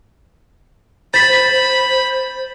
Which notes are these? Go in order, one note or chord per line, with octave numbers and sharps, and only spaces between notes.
C5 B5 A6 B6